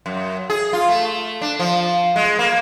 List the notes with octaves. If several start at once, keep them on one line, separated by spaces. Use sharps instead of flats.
F#2
G#4
F4
A3
D4
F3
G#3
A#3